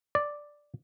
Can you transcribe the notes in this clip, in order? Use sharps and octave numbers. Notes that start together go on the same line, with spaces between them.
D5